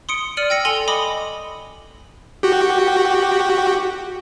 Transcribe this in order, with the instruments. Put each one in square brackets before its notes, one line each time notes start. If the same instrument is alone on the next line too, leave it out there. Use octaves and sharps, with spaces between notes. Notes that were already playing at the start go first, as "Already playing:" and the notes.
[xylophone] C6 D#6 C#7 D7
D5 F6 C#7 D#7 F#7
G5 E6 A#6 C#7
A4 G#5 C6 F7 G7
D#5 B5 C6 D6 D#6
[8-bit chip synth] F#4 G4